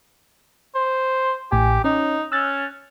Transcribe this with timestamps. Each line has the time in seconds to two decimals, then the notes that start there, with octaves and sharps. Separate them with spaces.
0.75 C5
1.52 A1 A2 G4 G#5
1.84 C#4 D#4
2.32 C#4 E6 F#6 A6